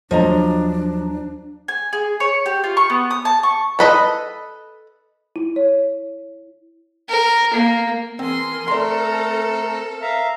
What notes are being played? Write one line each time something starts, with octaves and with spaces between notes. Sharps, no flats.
D#2 F3 F#3 D4 D#5 A#5
G#5
G#4
C#5
G4
F4
C#6
B3
D#6
A5
C#6
A4 B4 D#5
E4
C#5
A#4
A#3
E3 C4 G#4 A#4 C6
A3 C4 A4 D5 A#5 C6
E5 F5 A#5